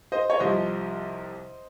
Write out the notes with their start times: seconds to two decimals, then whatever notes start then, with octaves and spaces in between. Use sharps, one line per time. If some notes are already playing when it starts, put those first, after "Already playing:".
0.12 C5 D#5
0.30 C#5
0.40 C2 C3 F3 C5 D#5